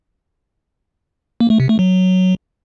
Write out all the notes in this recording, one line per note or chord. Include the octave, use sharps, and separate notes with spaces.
A#3
A3
C3
A3
F#3